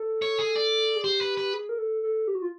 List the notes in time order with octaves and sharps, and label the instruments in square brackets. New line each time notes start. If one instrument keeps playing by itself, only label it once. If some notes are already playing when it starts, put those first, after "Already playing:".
Already playing: [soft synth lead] A4
[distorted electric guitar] C#5
G#4
D5
[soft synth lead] G#4
[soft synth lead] G4 [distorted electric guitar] C5
[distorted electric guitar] B4
B4
[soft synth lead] G#4
A#4
A4
A4
G4
F#4
F4